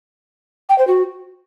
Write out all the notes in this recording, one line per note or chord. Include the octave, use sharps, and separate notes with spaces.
G5
C5
F#4